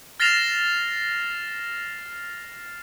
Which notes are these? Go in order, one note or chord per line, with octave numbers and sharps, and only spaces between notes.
F6 A6 A#6 C7 E7 F7